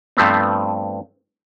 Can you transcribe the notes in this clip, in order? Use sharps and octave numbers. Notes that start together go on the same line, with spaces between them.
G2 F3 A3 B3 C4